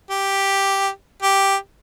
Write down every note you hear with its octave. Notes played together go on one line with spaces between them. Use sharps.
G4
G4